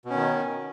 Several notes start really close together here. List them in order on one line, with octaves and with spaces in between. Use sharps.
B2 C#4 D#3